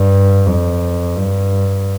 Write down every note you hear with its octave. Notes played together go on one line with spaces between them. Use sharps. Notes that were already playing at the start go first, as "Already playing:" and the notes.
Already playing: G2
F2
G2